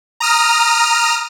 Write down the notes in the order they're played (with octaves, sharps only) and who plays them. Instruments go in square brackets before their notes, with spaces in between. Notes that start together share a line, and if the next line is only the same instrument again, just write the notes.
[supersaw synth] A#5 D#6 F6